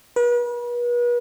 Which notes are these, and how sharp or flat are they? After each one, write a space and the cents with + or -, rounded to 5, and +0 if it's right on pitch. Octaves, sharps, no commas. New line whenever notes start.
B4 -40